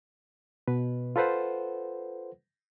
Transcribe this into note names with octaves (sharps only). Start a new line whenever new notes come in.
B2 B4
F4 A4 B4 C5 F#5